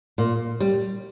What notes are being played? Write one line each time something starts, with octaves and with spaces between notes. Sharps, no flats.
A#2
G3